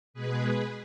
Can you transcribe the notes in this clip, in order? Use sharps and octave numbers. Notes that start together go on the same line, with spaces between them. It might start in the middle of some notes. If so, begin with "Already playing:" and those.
B2 G#3 G#4 B4